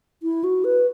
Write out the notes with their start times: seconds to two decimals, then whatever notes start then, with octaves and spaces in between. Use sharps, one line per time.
0.23 E4
0.44 F#4
0.64 B4